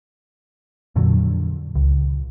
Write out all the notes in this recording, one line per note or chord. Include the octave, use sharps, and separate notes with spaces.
F2 A#2 D3 F#3
C#2